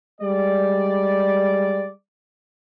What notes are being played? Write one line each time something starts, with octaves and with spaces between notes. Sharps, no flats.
G3 G#3 D5